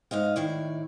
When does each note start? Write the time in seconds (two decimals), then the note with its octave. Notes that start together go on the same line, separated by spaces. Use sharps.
0.11 G#2 D#4 D#5 F5
0.36 A2 D#3 E4 D5